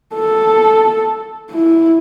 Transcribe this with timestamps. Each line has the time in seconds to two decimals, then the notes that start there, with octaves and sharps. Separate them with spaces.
0.15 A4
1.52 E4